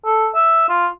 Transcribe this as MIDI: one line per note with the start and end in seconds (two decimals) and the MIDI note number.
0.05 0.28 69
0.35 0.69 76
0.69 0.87 65